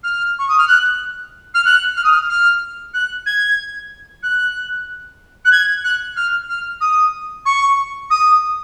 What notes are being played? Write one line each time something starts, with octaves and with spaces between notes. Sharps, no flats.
F6
C#6
D#6
F6
F#6
F6
F#6
F6
D#6
F6
F6
F#6
G#6
F#6
F#6
G#6
F#6
F6
F6
D#6
C#6
D#6